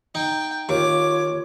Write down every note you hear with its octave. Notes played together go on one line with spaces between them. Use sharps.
D#4 G5
D#2 F4 C#5 D6